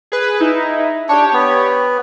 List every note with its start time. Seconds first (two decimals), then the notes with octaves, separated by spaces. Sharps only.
0.12 G#4 B4
0.40 D#4 E4
1.09 D4 G4 C#5
1.33 B3